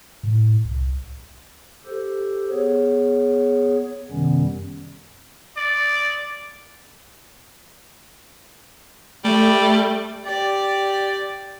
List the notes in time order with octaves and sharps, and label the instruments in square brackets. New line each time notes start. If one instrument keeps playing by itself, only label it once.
[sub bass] A2
C2
[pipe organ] G4 A4 C5
B3 G#4 C#5
F#2 C3 D#3 G3 B3 C#4
[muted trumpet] D5
[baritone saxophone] G3 [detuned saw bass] A3
[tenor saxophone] G4 [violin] D5